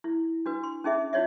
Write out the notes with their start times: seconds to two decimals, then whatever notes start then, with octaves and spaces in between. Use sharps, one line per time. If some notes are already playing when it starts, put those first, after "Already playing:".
0.04 E4
0.46 D4 F#4 B4
0.63 C6
0.84 C#4 D#4 G#4 E5
1.13 D#4 F4 C#5 D5 E5